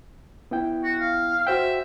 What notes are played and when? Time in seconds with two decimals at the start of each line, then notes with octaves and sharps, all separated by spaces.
0.51 B3 E4 G5
0.84 F#4
0.99 F5
1.47 F#4 C5 E5 G5